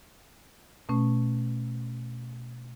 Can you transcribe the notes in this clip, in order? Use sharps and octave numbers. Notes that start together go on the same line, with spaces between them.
B2 A3 C#4